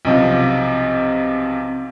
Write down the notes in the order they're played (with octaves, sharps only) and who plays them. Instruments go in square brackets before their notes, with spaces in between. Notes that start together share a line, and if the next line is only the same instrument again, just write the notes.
[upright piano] B1 C3 F3